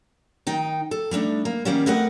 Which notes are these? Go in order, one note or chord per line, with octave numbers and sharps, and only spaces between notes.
D#3 D#4 G5
A4
G3 A3 D4 D#4
A#3
D#3 F3 G3 A#3 B3 C#4
A3 C4 A#4 B4 D#5 F#5